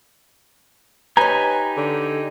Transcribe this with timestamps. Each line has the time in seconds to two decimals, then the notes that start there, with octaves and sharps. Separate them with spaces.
1.17 D#4 G4 B4 C#5 G#5 A#5
1.77 D3